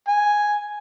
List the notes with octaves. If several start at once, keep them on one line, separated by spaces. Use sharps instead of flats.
G#5